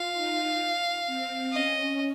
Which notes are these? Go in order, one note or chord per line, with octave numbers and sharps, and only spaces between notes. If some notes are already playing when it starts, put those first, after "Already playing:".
Already playing: F4 F5
D#4
C4
C#4 D#5